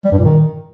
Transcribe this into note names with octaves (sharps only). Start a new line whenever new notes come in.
G3
G2
A#2
D#3